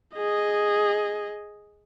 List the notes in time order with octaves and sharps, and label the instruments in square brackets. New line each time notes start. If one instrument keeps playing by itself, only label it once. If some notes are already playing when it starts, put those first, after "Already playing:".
[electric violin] G#4 D#5